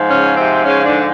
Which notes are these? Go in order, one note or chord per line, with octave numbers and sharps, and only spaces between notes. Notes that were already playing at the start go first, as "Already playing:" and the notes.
Already playing: G#2 F3
C#3 C#4
C3 C4
C#3 C#4
D3 D4